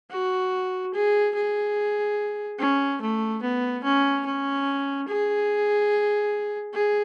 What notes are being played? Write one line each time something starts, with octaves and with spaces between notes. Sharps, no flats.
F#4
G#4
G#4
C#4
A3
B3
C#4
C#4
G#4
G#4